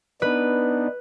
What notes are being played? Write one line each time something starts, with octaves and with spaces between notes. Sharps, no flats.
B3 D4 D#4 B4